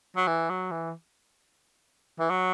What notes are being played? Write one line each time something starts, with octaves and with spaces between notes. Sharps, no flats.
F#3
E3
F#3
E3
E3
F#3